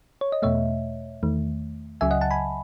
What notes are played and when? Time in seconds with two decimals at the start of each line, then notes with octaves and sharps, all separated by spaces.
0.21 C#5
0.32 D#5
0.42 E2 B2 A3 C#5 E5
1.23 E2 D#3 A3
2.01 C#2 C#3 F#3 E5 G#5
2.11 D#5 F#5
2.21 F#5 A5
2.31 G#5 B5